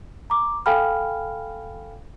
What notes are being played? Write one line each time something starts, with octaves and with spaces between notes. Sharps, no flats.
A#5 D6
A4 F5 G5 G#5 B5 F6